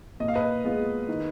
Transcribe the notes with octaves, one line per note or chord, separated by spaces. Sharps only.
A#2 D#5
F5
B4 D#5
G#3 B3 F4
D#3